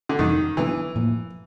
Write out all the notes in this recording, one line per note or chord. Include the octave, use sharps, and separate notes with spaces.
D3
F2 C3 D#3 E3 G3
D3 E3 F#3 B3 D4
A2 F3 A#3